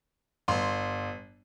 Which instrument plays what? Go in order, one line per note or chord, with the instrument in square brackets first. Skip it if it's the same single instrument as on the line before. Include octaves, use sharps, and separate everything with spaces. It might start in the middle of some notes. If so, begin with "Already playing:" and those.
[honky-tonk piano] G1 C6